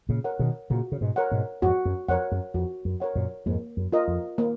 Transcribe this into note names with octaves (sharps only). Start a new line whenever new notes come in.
A#2 C#3
A#4 C#5 F#5
B2 D#3
A#2 C#3 F#4
C#3
G#2 B2
A#4 C#5 F#5
G#2 B2
F2 G#2 F#4
F#2
F2 A#4 C#5 F#5
F#2
F2 F#4
F#2
A#4 C#5 F#5
F#2 A#2
F2 G#2 A#3
F#2
F4 A#4 D#5
F2
A#3